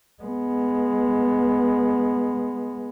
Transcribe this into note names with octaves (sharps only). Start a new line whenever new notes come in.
G#3 B3